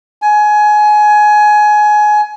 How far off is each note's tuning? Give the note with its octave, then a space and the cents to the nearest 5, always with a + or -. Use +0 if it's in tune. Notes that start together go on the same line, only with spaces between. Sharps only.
G#5 +20